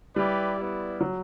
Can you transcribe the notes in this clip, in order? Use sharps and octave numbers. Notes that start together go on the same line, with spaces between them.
G3 E4 G4 B4 D5
B3 E4 B4 D5
F#3